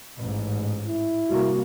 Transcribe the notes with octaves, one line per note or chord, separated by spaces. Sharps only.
A1 G#2
E4
C3 G3 A#3 F#4